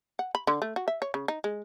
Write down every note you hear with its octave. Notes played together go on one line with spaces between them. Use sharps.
F#5
B5
D3
A3
F#4
E5
C#5
C#3
D#4
G#3